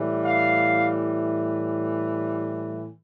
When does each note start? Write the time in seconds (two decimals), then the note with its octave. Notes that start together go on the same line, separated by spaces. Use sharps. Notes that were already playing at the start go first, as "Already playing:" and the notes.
Already playing: A2 E3 G3
0.25 F5